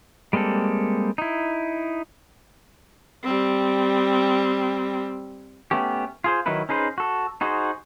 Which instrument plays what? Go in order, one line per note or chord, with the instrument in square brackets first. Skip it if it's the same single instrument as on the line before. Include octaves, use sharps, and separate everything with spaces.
[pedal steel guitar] G3 G#3 A#3 C4 A4
D#4 E4
[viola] G3 C4
[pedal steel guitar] A3 B3 C#4 G4
F4 G#4 C5
D#3 F#3 D#4 E4 B4
C#4 D#4 G#4 B4 C5
F#4 A4
D#4 F#4 G#4 C5